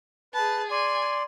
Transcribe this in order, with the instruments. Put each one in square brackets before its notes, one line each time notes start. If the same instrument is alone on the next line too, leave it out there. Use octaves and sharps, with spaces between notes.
[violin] G#4 A5 [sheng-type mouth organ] B4
[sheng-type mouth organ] D5 C6 [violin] G#5